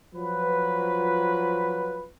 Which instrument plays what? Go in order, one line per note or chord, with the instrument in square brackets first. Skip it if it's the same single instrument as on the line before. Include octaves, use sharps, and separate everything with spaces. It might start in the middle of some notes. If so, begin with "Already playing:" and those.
[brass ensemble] F3 F#3 F4 B4